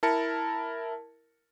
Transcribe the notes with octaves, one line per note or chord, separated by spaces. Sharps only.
E4 A#4 A5 C#7